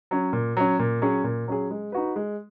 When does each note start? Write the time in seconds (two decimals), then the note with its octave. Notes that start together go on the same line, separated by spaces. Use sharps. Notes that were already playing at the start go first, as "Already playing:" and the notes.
0.11 F#3 C#4
0.33 A#2
0.57 F#3 C#4
0.79 A#2
1.02 F#3 C#4 G#4
1.24 A#2
1.48 F#3 C#4 G#4
1.71 G#3
1.92 D#4 F#4 B4
2.16 G#3